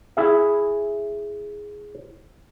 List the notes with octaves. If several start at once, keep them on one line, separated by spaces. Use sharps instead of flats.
E4 G#4 E5